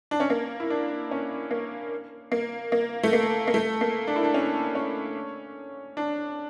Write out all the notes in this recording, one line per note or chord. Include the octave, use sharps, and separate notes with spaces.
D4
C#4
A#3
E4
D4
C#4
A#3
A#3
A#3
A3
A#3
A#3
A3
A#3
D4
E4
D4
C#4
C#4
D4